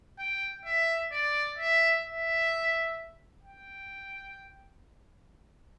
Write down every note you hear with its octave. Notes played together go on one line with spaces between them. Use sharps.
G5
E5
D5
E5
E5
G5